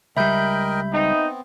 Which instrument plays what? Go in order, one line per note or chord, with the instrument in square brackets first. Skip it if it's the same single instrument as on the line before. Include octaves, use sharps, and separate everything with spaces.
[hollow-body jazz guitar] C#2 G3 [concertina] A#4 D#5 G5 [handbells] E5 B5 G6
[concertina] B3 C4 [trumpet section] D#4